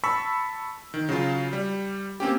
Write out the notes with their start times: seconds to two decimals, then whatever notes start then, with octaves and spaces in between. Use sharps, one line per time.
0.04 A5 B5 C#6 E6 B6
0.94 D#3
1.09 C#3 F#3 F4
1.53 G3
2.20 A#3 C4 C#4 G4